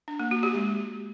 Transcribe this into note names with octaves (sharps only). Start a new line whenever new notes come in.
D4
A#3
F#4
G4
G#3